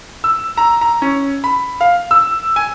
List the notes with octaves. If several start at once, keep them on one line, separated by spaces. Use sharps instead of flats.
E6
A#5
A#5
C#4
B5
F5
E6
G#5